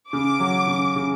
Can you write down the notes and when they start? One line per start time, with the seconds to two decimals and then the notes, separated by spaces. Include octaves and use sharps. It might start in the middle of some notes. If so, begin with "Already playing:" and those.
0.12 C#3 D6
0.40 F#3
0.67 C#3
0.96 C#3